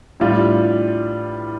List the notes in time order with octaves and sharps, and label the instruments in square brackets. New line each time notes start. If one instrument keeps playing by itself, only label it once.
[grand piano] A2 E3 G3 D4 F4